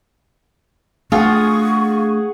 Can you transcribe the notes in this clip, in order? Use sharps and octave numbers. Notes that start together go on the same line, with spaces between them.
A3 D4 F4 G#4 F#5 C#6 D#6